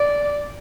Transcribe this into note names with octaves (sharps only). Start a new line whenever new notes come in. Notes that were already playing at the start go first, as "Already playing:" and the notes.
Already playing: D5